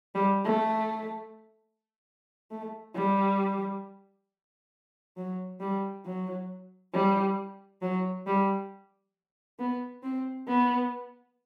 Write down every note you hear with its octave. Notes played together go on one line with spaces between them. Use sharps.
G3
A3
A3
G3
F#3
G3
F#3
G3
F#3
G3
B3
C4
B3